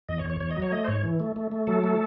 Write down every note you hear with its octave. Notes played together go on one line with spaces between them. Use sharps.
E2 D#5
C#5
E2
C#5
E2 C#5
D#5
F#3
C#5
A3 D#5
C5
G#2 C#5
E3
A3
A3
A3
F#3 A4
A3